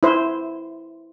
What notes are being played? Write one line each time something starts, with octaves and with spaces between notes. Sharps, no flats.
E4 C5